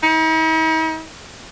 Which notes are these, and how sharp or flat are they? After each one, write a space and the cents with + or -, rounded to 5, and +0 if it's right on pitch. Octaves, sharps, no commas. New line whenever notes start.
D#4 +45